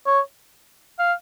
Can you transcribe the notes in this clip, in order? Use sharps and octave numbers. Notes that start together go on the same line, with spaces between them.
C#5
F5